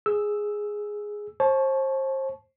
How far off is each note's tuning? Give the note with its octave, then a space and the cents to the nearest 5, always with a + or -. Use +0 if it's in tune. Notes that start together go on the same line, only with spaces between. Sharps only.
G#4 +0 E6 +0
C5 +35 A5 -25 C#6 +0